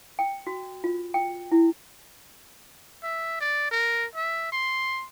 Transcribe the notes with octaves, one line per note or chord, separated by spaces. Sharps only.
G5
F#4
F4
G5
E4
E5
D5
A#4
E5
C6